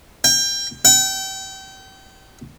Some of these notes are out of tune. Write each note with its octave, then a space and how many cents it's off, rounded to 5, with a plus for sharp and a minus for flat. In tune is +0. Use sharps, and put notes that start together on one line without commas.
G5 +25
G5 -30